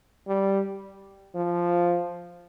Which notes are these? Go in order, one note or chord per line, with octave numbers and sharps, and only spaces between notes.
G3
F3